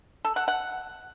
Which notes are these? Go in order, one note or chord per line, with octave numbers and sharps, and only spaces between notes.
A4
F#5
F#5